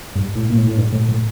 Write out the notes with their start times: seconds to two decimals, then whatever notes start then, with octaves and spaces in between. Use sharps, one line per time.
0.15 G2
0.35 A2
0.50 A#2
0.57 A2
0.67 A2
0.77 G2
0.92 A2
1.09 A2